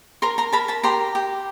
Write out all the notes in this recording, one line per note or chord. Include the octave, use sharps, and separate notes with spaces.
A#4 A#5 C6
A#5 C6
A#4 A5 B5
A5 B5
G4 A#5 C6
G4